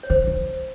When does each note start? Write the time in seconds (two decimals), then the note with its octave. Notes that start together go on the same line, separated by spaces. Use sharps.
0.03 C#5
0.10 D#3 C5
0.27 D#3